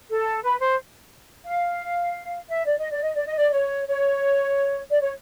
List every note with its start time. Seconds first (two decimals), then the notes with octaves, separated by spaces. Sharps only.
0.09 A4
0.43 B4
0.60 C5
1.45 F5
2.50 E5
2.66 D5
2.78 D#5
2.91 D5
3.02 D#5
3.14 D5
3.27 D#5
3.38 D5
3.53 C#5
3.87 C#5
4.90 D5
5.01 C#5